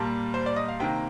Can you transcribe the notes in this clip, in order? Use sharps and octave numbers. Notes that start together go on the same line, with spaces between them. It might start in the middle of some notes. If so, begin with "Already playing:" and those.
Already playing: A#2 G3 A#3 A5
C5
D5
D#5
F5
C3 D#3 A#3 G5